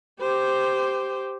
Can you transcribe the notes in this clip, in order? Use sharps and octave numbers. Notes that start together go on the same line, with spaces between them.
G4 C5